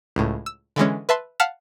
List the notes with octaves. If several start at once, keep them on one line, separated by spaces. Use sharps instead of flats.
C#2 A2
E6
D3 E3 G#3 C#4
B4 E5 A5 C6
F5 F#5 A5 F6 B6 E7